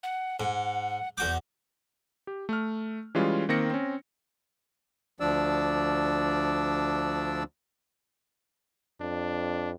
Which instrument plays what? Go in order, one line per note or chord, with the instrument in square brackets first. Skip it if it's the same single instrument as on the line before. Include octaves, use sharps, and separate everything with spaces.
[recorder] F#5
[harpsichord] G#2 [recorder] F#5
[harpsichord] E2 F#4 D6 [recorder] G6
[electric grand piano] G4
A3 F6
E3 G3 G#3 C#4 F4
D#3 A#3 C4 A#6 C#7
C4 C#4
[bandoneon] D2 F3 D4 D5 E6
[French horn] F2 [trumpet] D4